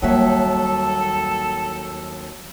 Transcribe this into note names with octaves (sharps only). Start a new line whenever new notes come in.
D#2 F#3 G3 A#3 A4 E5